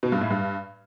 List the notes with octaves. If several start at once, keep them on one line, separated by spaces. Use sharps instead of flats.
B2
G2
A2
G2